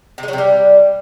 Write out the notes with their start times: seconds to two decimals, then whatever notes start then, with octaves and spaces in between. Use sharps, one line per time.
0.18 C3
0.23 G#3
0.28 F#3
0.33 C3
0.38 G3